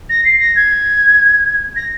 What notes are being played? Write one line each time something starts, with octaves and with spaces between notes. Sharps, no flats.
A#6
C7
A#6
G#6
A#6